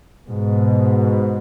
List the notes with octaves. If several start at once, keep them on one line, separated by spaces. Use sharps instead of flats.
G#2 B2